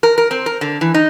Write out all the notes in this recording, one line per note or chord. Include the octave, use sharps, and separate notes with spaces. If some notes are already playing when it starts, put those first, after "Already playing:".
A#4
A#4
C4
A#4
D3
E3
D#4